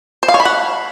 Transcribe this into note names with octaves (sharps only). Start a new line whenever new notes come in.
C5
F5
C#5
B5
F#5